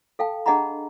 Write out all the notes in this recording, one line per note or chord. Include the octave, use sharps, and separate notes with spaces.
A4 F5 G5 A5
D4 G#4 D#5 F#5 A#5 B5